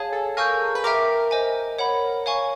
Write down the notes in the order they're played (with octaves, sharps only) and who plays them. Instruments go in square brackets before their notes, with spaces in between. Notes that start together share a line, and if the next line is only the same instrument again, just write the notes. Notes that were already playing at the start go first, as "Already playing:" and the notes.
Already playing: [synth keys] G#4 [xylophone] C#5 F5 A5
[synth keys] A4
[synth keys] A#4 [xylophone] F5 G#5 C#6 E6 G6
[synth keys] B4
[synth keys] A#4 [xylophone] E5 G5 A#5 D6
[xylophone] C5 D#5 G#5
C#5 F#5 B5
C#5 F5 G#5 C#6